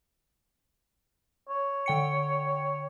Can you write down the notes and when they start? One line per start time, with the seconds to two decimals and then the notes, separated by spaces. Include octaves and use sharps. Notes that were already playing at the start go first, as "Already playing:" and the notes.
1.49 C#5
1.86 D3 G5 C#7